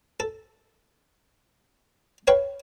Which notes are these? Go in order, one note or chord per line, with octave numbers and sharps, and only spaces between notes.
A4
B4 C#5 F5 G5